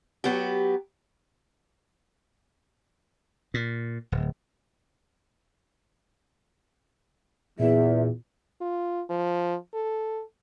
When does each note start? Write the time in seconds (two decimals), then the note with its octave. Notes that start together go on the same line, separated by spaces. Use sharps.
0.24 F#3 B3 G4
3.54 A#2
4.12 D1
7.59 E2 A#2 E5
8.61 F4
9.10 F3
9.74 A4